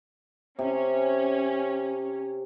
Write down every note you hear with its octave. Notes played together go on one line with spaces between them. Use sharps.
C3 C#4